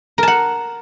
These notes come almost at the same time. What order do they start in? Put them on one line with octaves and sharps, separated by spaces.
A#4 A5 F#5